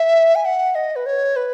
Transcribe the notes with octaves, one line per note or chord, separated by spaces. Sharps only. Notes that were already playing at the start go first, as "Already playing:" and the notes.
Already playing: E5
G#5
F#5
D#5
B4
C#5
B4